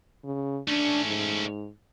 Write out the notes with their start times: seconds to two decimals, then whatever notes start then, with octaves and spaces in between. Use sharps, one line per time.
0.24 C#3
0.68 A3 C#4 D4
1.06 G#2